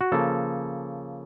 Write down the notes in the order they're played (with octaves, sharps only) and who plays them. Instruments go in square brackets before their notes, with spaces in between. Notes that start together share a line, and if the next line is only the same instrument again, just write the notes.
[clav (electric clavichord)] F#4
C#3 F3 A#3 A4